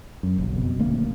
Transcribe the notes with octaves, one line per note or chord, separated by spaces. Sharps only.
F#2
F#1 B1
F2 B2
D#1 D2 A3 A#3